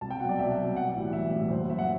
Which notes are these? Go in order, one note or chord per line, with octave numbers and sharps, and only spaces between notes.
C2 A5
G5
B2 F#3 F#5
D5
C2 E5
B2 F#3
B1 F#5
A2 E3 G3
B1 E5
A2 E3 G3
F#1 C5
F#2 F#3 E5
F#5